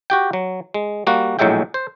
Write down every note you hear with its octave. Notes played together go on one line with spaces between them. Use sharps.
F#4 G4 G5
F#3
G#3
G3 A#3 F#4
A#1 A2 F#3 G#3 E5 G5
C5